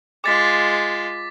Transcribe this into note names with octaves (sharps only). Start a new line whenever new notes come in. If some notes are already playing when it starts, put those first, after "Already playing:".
G#3 F4 D6 A6 B6